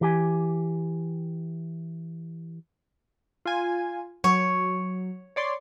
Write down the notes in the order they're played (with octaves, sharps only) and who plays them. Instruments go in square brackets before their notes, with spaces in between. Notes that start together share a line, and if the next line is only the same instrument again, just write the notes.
[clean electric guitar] E3 G4 G#5
[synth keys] F4 G#5
[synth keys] F#3 [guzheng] C#5
[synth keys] C#5 D5 C6